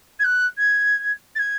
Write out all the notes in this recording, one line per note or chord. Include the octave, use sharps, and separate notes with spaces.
G#6
F#6
G#6
A6
G#6